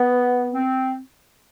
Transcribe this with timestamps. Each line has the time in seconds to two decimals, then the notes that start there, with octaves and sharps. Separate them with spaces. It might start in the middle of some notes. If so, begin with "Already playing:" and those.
Already playing: B3
0.51 C4